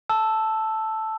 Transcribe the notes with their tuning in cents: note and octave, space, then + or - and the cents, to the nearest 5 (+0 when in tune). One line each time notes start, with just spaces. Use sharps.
A5 +0 E6 +0